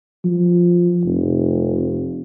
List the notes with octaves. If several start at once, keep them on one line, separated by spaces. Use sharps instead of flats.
F3
F1